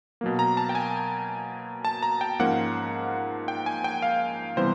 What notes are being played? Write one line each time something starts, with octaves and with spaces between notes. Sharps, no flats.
B2 F#3 A#3
A#5
A5
G5
G#5
A5
A#5
G5
G#2 F3 A#3 C#4 F#5
G5
G#5
G5
F5
C3 E3 G3 B3 C5